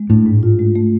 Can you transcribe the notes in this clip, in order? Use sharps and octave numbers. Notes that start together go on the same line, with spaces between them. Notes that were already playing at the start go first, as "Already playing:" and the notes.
Already playing: G#3
A2 D4
G#2
F4
G#3
A3